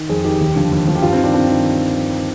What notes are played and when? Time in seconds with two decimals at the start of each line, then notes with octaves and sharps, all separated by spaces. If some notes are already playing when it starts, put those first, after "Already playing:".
Already playing: D#3
0.09 F2 G#4
0.24 D#3 G4
0.41 D#2
0.56 D3 F3
0.71 D#2
0.87 D3 F3
0.95 G4
1.02 G2 F4
1.13 C4
1.18 D#3
1.23 D4
1.33 G2 C4
1.49 D#3